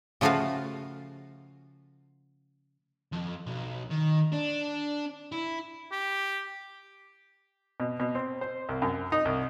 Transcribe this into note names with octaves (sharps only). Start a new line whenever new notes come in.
C#3 F3 A3 F4 F#4 F5
F2
B1
D#3
D4
E4
G4
B2
B2
C4
C5
C2
F#2
D#4
C2